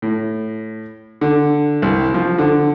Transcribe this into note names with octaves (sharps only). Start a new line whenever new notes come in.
A2
D3
C2
F3
D3